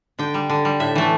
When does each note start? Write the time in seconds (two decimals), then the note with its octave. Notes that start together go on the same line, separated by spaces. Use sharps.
0.19 D3 G5
0.34 G3
0.50 D3
0.65 G3
0.80 A2 E5
0.95 E3 A3